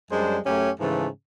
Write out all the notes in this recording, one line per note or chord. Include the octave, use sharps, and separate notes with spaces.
F#2 G3 G#3 D4 C5
F#2 A3 C#4 G4
G#2 C#3 E3 F3 A3